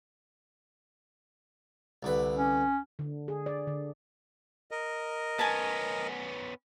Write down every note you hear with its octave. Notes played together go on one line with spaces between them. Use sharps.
C2 D3 B4
C#4
D3
G#4
D5
D3
A#4 D#5
B3 C#4 G#5 A5